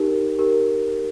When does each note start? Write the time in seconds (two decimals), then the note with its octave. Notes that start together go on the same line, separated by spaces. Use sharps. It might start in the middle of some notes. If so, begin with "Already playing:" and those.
Already playing: D#4 G4 A#4
0.39 D#4 G4 A#4